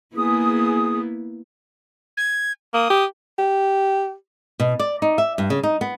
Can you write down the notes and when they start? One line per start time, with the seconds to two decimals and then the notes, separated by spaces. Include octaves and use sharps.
0.16 A#3 B3 E4 G#4 D#6
2.17 G#6
2.74 A#3 D#6
2.90 G4
3.38 G4
4.60 B2
4.79 D5
5.02 D#4
5.18 E5
5.38 G2
5.50 C#3
5.63 D#4
5.81 B3